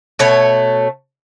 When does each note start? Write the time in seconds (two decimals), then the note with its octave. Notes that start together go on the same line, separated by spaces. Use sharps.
0.19 B2 A3 C#5